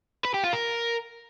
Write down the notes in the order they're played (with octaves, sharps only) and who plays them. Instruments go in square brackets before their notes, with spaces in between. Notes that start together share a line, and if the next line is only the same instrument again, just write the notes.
[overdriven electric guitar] B4
G4
F4
A#4